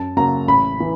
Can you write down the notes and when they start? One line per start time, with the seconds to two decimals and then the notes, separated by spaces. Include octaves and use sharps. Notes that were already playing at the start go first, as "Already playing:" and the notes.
Already playing: F#2 A5
0.17 C#3 F#3 A#3 A#5
0.48 A1 B5
0.80 E3